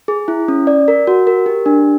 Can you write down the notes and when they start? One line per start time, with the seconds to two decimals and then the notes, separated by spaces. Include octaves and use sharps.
0.08 G#4
0.28 E4
0.48 C#4
0.67 D5
0.88 A#4
1.07 F#4
1.27 A#4
1.46 G4
1.66 D4